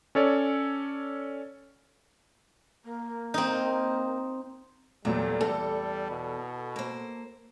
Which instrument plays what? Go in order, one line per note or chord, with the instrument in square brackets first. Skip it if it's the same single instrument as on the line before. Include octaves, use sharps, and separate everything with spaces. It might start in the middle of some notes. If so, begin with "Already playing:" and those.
[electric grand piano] C#4 A4 C#5 D5
[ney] A#3
[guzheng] C4 D#4
[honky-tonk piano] E2 A#2 F#3 [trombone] G3 [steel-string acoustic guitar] A3
[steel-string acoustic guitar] E2 [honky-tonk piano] A4
[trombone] B2
[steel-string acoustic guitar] A#3 C5